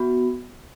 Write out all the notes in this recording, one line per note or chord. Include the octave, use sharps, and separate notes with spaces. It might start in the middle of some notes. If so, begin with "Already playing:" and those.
Already playing: B3 F#4